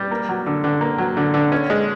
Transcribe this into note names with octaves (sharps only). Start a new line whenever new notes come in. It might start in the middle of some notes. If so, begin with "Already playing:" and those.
Already playing: G3
A#3
F#3
D3
D3
A#3
F#3
D3
D3
C#4
G#3